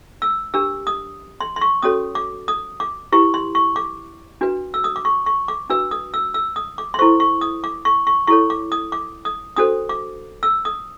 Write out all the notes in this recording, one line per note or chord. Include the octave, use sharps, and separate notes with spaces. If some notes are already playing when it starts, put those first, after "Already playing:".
E6
D4 G4 A#4 E6
D#6
C6
C6
C#6
C#4 F#4 A4 C#5 D#6
D6
D#6
D6
E4 G4 B4 C#6
C6
C#6
D6
D4 F#4 B4
E6
D#6
D6
C#6
C#6
D6
D4 F#4 B4 E6
D#6
E6
E6
D#6
D6
C6
E4 A4 C5 C#6
C#6
D#6
D6
C#6
C#6
E4 A4 C#5 C#6
D6
D#6
D6
D#6
D4 F#4 A4 C5 D#6
D6
E6
D#6